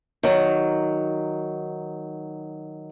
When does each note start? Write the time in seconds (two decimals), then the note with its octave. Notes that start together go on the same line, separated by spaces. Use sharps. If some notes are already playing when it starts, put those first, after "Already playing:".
0.23 D#3 F#3